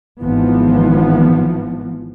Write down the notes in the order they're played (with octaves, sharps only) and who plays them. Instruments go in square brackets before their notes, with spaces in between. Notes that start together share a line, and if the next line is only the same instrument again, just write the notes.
[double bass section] G#1 E3 F3 B3